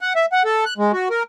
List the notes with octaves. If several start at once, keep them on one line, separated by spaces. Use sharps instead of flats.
F#5
E5
F#5
A4
F#6
G#3
F#4
A#4